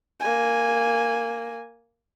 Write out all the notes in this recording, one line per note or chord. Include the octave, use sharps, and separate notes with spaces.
A#3 G#5